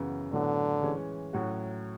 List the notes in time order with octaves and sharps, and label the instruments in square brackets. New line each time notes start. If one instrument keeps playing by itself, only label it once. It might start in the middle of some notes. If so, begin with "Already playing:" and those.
Already playing: [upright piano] F#2 C#3 E3 B3
[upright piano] A2 F#3 B3 [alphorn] D3
[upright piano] E3 G#3 C#4
A2 F#3 C#4 F#4